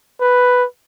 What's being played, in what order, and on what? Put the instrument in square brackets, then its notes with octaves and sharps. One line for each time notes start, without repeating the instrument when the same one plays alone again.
[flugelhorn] B4